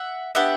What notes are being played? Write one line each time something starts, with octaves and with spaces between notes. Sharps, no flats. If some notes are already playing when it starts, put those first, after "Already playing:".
Already playing: E5 F#5
B3 D4 G4 E5 F#5